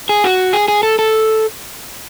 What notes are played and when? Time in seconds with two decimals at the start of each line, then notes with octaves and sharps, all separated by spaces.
0.09 G#4
0.24 F#4
0.53 G#4
0.68 G#4
0.83 A4
0.99 A4